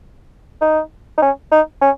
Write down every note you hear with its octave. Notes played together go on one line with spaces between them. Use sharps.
D#4
D#4
C#4
D#4
C#4